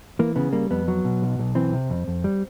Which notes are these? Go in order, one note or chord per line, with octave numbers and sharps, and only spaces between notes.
E3 A#3
C#3 B3
G3 A#3
F2 B3
F#3
B2
B1
B1
E3 C4
C3
F2
F2
G3